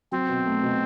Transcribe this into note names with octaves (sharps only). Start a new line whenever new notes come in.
F#3 C4
B2
A3
B2